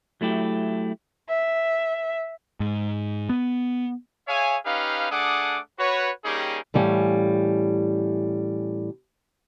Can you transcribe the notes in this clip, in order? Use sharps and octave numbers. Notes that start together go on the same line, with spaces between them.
F#3 A3 E4 G4
E5
G#2
B3
G#4 C#5 E5 F5 G#5
C#4 D#4 G4 B4 F5
A3 D4 G#4 F#5 D6 D#6
F#4 B4 C#5
G3 A#3 C#4 D#4 G4 G#4
A2 E3 G3 C#4 F5